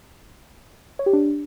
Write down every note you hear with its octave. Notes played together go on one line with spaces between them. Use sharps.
C#5
G4
D4